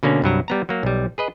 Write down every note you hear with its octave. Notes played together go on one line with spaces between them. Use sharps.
B2 D3 A#3 C#4
C2 G2 F#3 A#5
G3 B3 A#5
F#3 A#3
B1 G3
G#4 B4 D#5